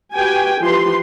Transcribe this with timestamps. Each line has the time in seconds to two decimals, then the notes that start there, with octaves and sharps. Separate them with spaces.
0.14 F#4 G4 B4 G5 G#5
0.61 E3 F3 G4 B4 C6